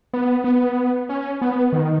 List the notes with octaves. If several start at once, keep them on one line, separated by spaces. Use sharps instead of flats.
B3
B3
C#4
B3
D#3